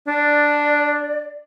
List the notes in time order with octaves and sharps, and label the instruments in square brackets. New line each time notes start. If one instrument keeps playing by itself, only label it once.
[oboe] D4 [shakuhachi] D5